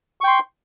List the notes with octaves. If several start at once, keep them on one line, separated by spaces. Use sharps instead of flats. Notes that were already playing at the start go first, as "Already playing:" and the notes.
G5 C6 C#6